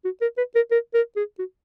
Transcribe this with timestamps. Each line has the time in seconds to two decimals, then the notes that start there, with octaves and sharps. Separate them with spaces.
0.05 F#4
0.22 A#4
0.38 B4
0.56 A#4
0.71 A#4
0.94 A#4
1.17 G#4
1.39 F#4